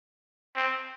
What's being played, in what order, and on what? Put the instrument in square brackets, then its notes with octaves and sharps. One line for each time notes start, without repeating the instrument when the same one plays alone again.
[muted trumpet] C4